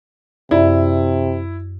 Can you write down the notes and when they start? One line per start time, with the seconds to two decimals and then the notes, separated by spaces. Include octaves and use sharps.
0.51 F#2 C3 E4 D5